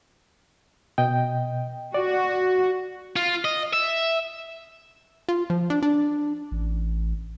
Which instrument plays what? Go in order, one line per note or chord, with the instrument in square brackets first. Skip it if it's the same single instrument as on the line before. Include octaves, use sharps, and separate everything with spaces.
[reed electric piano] B2 D#5 G5
[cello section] F#4 [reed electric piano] D5
[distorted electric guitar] F4
D#5
E5
[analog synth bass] F4
F3
D4
D4
[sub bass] A1